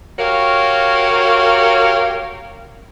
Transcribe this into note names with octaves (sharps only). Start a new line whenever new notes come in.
F#4 G4 A#4 C#5 F5